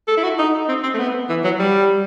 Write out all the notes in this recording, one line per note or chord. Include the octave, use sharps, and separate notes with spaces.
A4
E4
F#4
D#4
C4
C4
A3
B3
E3
F#3
G3